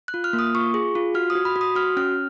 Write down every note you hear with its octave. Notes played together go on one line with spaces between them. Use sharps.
F#6
F4
F6
A#3
D#6
F4 C#6
G#4
F4
F#4 F6
D#6
F#4
B5
F#4
D#6
F#4 F6
C#4 F6